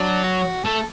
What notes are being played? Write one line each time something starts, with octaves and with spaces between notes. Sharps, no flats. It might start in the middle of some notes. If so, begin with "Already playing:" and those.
Already playing: F#3 D4
F#4
A3 A4